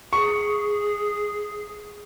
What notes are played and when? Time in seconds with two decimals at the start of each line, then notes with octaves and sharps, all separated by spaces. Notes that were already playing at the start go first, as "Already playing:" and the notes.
0.13 G#4 C#6